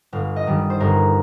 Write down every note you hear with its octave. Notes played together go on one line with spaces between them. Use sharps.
G1 F5
D#5
G2 D#3 G3
C5
G1 A#4